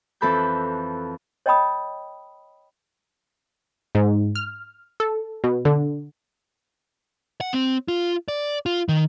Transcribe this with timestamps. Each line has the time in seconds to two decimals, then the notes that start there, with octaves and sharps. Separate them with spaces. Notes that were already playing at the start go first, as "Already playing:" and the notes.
0.21 F2 E3 A4 B5 F#6 G6
1.46 C#5 D#5 G5 A5 B5 D#6
3.95 G#2
4.35 F6
5.00 A4
5.44 B2
5.65 D3
7.41 F#5
7.53 C4
7.88 F4
8.28 D5
8.66 F4
8.89 D#3